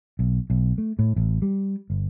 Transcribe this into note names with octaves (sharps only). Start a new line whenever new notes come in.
B1
B1
A3
A2
A1
G3
G1